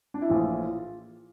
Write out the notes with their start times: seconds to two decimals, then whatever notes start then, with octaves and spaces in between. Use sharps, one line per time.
0.14 D4
0.22 E4
0.29 A#1 A2 E3 F4